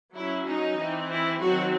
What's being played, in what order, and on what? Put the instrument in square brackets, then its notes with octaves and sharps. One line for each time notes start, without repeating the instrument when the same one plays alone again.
[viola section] F#3 C#4 E4
D#4
E3 C4
E4
D#3 F#3 C4 F#4